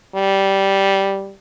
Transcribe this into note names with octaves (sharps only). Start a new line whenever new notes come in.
G3